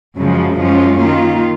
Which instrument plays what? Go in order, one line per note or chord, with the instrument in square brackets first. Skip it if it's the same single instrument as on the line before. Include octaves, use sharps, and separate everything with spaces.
[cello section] F#2 C#3 F3 G#3
F#2 F3 G#3 C#4 F4
D#3 A#3 F4